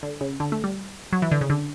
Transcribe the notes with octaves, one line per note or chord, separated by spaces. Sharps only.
D3
C#3
D3
A3
G3
F#3
E3
D3
C#3
D3